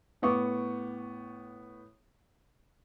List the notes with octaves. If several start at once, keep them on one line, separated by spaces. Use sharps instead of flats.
A2 B3 C#6 D6